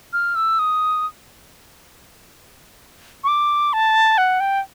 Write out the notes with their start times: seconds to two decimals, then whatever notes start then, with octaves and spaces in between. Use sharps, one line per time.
0.13 F6
0.35 E6
0.59 D#6
3.24 C#6
3.28 D6
3.73 A5
4.18 F#5
4.40 G5